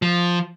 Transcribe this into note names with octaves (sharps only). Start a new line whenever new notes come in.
F3